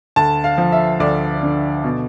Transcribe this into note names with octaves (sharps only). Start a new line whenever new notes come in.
D2 A5
F5
F3
E5
D2 D5
D3
B2